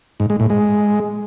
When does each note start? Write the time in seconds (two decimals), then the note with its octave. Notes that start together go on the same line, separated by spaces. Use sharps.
0.20 G#2
0.30 G#3
0.40 A2
0.50 G#3